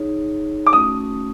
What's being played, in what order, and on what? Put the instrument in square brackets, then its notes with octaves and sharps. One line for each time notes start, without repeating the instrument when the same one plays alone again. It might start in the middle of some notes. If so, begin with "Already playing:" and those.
Already playing: [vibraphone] D#4 G#4 C#5
[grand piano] D6
[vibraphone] A3 C#4 F#4 [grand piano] D#6